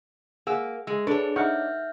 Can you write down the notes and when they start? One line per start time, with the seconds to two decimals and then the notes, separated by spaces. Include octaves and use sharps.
0.47 A#3 G#4 F#5 E6
0.87 G#3 E6
1.07 D4 G#4 A4 B4 C#5 C#6
1.36 D#4 E5 F#5 C#6 F6 G6